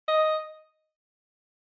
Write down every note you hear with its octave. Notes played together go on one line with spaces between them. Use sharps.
D#5